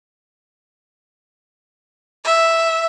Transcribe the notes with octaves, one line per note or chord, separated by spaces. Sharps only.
E5